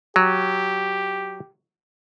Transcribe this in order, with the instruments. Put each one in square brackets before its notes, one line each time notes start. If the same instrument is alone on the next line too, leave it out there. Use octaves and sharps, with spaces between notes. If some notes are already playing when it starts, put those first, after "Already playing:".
[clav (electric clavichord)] F#3 [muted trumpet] G4